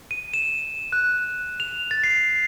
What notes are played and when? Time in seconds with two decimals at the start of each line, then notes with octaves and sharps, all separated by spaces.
0.11 D#7
0.34 E7
0.92 F#6
1.60 F7
1.91 A6
2.03 C7